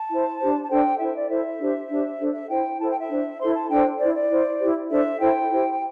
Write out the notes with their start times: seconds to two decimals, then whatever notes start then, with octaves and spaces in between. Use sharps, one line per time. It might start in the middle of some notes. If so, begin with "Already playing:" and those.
Already playing: A5
0.09 E4 C5
0.39 D4 G4 C5
0.64 A5
0.69 D4 A4 C5 G5
0.99 E4 A4 C5 E5
1.15 D5
1.29 E4 A4 C5 E5
1.60 D4 G4 C5
1.90 D4 G4 C5
2.19 D4 A4 C5
2.34 E5
2.49 E4 C5 G5
2.79 E4 A4 C5 A5
2.90 G5
3.00 E5
3.09 D4 C5
3.39 E4 A4 C5 C6
3.54 A5
3.70 D4 A4 C5 G5
3.99 E4 C5 D5
4.15 D5
4.29 E4 C5
4.60 E4 G4 C5
4.90 D4 A4 C5 E5
5.19 E4 A4 C5 G5
5.50 E4 G4 C5